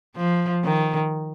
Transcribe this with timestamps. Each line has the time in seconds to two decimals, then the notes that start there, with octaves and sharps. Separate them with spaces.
0.17 F3
0.64 D#3